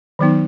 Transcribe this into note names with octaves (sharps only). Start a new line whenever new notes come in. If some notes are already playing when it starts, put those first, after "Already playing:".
D#3 F#3 B3 D#4